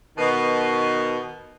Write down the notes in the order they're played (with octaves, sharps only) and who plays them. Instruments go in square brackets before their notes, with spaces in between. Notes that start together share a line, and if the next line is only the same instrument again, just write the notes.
[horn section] B2 D#3